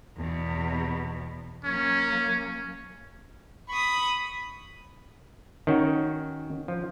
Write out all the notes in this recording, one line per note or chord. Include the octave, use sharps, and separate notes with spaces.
E2 B2
F#3 A#3 C#4
B5 C#6 D#6
D#3 C#4 F#4
F3